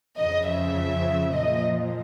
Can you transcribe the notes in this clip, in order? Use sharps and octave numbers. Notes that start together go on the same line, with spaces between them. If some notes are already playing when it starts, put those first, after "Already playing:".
F2 C#3 F3 D#5
E5
A#2 F3 D#5